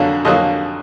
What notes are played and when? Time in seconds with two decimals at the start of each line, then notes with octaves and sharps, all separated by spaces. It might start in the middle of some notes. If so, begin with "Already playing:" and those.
Already playing: F2 D3 F#3 A#3
0.25 F2 D3 F#3 A#3 D#5